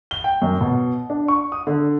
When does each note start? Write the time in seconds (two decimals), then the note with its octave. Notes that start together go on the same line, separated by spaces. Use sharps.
0.11 G7
0.24 G5
0.42 F#2
0.61 B2
1.10 D4
1.28 C#6
1.52 D#6
1.67 D3